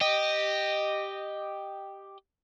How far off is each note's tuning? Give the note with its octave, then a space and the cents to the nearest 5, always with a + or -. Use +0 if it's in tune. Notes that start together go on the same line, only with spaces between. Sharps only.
G4 +0 D#5 -10